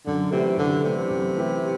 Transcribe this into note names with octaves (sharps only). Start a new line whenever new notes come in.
F#2 D3
C3 E3 A3 E4 G4
F#2 D3
C3 E3 A3 E4 G4
F#2
E3 A3 E4 G4